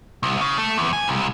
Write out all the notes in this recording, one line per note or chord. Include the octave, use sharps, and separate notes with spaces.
C2
C#3
A3
E2
G#5
C2